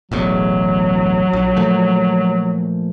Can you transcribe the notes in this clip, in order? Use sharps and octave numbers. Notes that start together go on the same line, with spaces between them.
E1 A1 E2 F#3
A#1
A#2 F3 A3